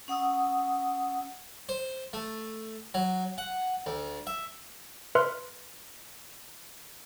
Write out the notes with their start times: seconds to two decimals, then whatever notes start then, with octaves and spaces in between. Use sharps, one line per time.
0.08 C#4 F#5 D#6 E6
1.69 C5
2.13 A3
2.94 F#3
3.38 F#5
3.86 D2
4.27 E5
5.15 B4 E5 C6 F6